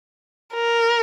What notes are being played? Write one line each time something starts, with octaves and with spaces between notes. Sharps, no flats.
A#4